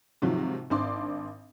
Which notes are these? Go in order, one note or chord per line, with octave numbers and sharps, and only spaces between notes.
G#2 C3 D#3 F3 F#3
G#1 C4 D4 C6 D6